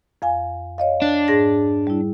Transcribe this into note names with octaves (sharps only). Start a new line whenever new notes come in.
F2 F5 G#5
C#5 D#5 F5
D4
G#2 G#4 A#6
G3 E4